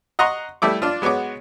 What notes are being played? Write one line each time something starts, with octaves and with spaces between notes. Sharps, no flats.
D#5 F#5 A#5 C6 C#6
G3 A3 E4 D6
D4 F4
G#3 B3 F#4 C#5 D6